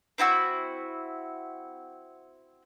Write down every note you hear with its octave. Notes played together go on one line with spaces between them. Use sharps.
C4 E4 F#4 E6